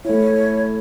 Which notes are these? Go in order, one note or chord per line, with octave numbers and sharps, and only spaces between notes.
A3 E4 C#5